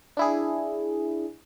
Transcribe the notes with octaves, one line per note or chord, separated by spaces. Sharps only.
D4 E4 G#4